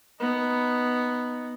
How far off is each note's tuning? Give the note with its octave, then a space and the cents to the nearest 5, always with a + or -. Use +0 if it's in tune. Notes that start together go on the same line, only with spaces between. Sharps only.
B3 +0 D#4 +0